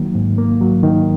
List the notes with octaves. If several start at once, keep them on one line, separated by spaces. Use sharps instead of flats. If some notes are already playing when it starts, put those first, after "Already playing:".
Already playing: D#3 F#3 A#3
G#2
A#3
F#3
D#3